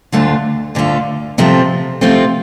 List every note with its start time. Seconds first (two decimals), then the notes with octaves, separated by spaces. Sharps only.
0.12 D2 D3 A3 F4
0.75 D2 D3 A3 F4
1.38 C3 F3 A3 C4 F4
2.01 C3 F3 A3 C4 F4